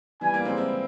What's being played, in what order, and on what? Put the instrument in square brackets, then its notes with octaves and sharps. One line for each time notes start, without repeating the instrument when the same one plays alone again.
[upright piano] E3 G3 [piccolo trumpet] G#5
[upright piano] G3 A#3
G#3 C4
C4 E4